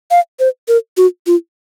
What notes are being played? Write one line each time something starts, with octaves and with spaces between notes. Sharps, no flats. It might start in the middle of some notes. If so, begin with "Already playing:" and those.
F5
C5
A#4
F#4
F4